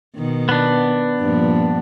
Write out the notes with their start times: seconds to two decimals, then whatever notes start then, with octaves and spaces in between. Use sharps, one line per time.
0.15 B2 D#3
0.49 B3 D4
1.19 G2 A#2 F3